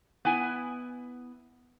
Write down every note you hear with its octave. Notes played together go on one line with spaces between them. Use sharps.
B3 E4 G#5